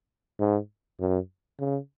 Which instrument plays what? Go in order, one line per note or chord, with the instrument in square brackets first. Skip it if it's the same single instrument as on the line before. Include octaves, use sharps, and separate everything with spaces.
[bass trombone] G#2
F#2
C#3